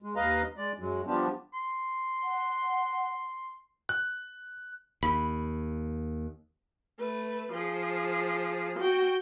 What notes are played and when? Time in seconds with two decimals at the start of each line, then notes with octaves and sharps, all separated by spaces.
0.02 G#3
0.16 D#2 B4 D#5 F5 A#5
0.57 G#3 D5
0.79 F#2 F#3 G#3
1.07 F3 G3 B3 D4 F4 G4
1.53 C6
2.24 F#5
3.89 F#6
5.03 D#2 B5
6.99 A3 B4
7.52 F3 G#4
8.79 F#4 G5